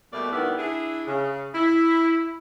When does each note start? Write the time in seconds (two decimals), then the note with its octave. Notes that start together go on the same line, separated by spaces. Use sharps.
0.13 B2 G3 A3 A#3 D5
0.31 G2 D#3 B3 E4 D5
0.58 D4 E4 G#4
1.07 C#3
1.55 E4